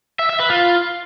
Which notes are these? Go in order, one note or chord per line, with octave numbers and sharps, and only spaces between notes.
E5
E5
B4
F4